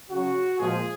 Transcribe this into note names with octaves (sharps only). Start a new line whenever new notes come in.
C#3 F#3 F#4
A#2 F3 G#3 G#4